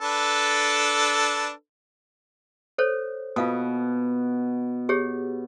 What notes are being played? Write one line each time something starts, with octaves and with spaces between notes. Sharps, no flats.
D4 A4 B4
A4 C5 C#5
B2 F4 F5 D#6
G4 G#4 C#5